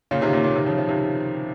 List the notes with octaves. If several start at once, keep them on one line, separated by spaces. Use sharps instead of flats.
A#2 C#3
C3 D#3
A#2 C#3
A#2 C#3
C3 D#3
C#3 F3
F3
C3 D#3